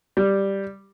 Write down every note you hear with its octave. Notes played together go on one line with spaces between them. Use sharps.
G3